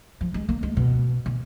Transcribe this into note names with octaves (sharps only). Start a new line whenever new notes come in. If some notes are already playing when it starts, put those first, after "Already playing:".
F3
G#3
A#3
G#3
B2
B2